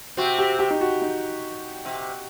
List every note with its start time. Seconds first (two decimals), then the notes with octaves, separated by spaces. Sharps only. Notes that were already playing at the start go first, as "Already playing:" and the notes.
0.17 C3 C4 F#4
0.39 G4
0.59 G4
0.71 D#4
0.81 F#4
1.02 D#4
1.85 C3 C4